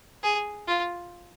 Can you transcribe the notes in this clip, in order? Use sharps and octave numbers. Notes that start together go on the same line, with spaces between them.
G#4
F4